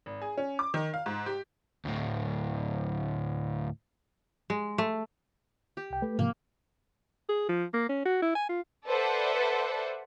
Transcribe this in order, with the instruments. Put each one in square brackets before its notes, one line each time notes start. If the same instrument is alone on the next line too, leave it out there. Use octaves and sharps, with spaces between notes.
[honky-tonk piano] G#1
G#4
C#4
D6
D#3
F5
G#2
G4
[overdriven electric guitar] D2 A2
[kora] G#3
A3
[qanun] G4
[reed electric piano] C2 G5
A3 A4 B4
[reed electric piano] G#2 C3 F3 [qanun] A#3
[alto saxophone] G#4
F3
A#3
C#4
F#4
E4
G#5
F4
[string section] A4 B4 C5 D5 E5 F#5